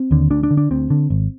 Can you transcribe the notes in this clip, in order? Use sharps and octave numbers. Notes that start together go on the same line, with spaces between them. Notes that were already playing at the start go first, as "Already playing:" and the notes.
Already playing: C4
D#2 D3
D2 D4
D4
D3
D4
D2 C4
D3
G#1